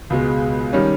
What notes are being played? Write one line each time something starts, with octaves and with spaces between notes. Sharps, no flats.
C#2 B2 G#3
D#3 G3 C#4